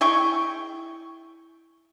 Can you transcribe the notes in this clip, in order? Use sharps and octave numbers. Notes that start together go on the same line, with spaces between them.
E4 G#4 G5 C#6